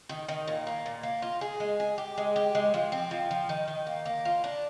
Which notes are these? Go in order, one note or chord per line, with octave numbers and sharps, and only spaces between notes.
D#3
D#3
A#2
A#3
A#2
A#3
F4
G#4
G#3
G#4
G4
G#3
G4
G#3
F3
C4
F3
F3
D#3
D#3
A#3
A#3
F4
D4